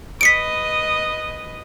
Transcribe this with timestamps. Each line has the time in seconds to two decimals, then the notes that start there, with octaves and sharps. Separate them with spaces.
0.21 B4 D#5 B6 C#7 D7